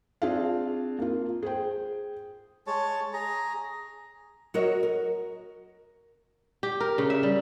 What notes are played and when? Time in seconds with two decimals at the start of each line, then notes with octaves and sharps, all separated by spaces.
0.22 C4 D4 F4 G#4 F5
0.99 A#3 F4
1.43 G#4 C5 G5
2.67 G#3 C#5 A5
3.13 G#4 A#5
4.54 F#3 F#4 A#4 C#5 D#5
4.83 A#4
6.63 G4
6.80 A#4
6.98 C#3
7.10 E5
7.23 G3